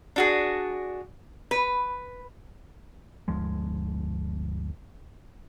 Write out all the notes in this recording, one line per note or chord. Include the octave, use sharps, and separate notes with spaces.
D4 F#4 G#4
B4
G1 D2 F3 G#3